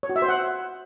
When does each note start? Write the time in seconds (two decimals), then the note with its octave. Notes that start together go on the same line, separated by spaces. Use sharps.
0.03 C#5
0.09 F#4
0.16 E5
0.22 C5
0.28 F#5